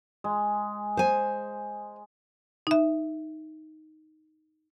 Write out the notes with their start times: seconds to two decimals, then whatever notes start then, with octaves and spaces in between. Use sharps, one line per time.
0.24 G#3
0.97 C5 G#5
2.67 D#4 E5